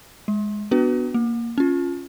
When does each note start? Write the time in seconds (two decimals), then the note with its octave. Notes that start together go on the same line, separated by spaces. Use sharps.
0.28 G#3
0.71 B3 D4 F#4 B4
1.14 A#3
1.58 C#4 F4